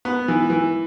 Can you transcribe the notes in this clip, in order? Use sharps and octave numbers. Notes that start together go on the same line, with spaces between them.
B3
E3
E3